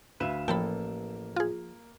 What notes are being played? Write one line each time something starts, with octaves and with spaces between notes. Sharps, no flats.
D2 B4 E5 F5 E7
A1 F3 A#3 A4 G5 A5 B5
F4 G#4